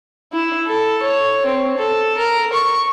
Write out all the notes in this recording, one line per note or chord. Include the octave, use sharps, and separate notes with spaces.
E4
A4
C#5
C4
A4
A#4
C#6